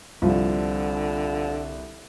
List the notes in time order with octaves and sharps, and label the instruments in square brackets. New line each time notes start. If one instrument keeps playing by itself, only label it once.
[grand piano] C2 [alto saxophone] D3 [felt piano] F3